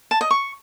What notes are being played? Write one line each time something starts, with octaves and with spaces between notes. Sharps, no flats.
A5
D#5
C#6